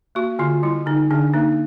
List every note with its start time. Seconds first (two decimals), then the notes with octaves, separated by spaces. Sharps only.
0.15 A#3 F#4
0.39 D3 F4
0.63 G3 E4
0.86 D3 D#4
1.11 D3 D4
1.33 A#3 D#4